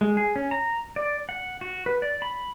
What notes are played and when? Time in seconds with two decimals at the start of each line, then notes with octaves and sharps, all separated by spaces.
0.01 G#3
0.17 G#4
0.36 C#4
0.51 A#5
0.96 D5
1.29 F#5
1.61 F#4
1.86 B4
2.02 D5
2.22 B5